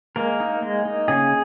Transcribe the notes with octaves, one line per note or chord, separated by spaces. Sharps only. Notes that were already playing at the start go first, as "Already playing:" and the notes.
G#3 A#3 A#4
D#4
G#3
D#4
C#3 G#4